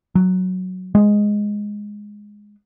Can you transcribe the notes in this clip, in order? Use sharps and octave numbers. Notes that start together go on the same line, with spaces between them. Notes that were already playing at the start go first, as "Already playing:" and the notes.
F#3
G#3